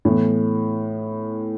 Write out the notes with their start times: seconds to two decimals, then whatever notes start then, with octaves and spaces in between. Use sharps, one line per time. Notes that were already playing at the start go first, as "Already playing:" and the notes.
0.05 A2 E3 B3